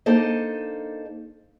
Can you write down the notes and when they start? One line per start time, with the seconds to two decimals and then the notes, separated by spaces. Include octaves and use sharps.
0.06 A#3 D4 D#4 A4 C5 D#5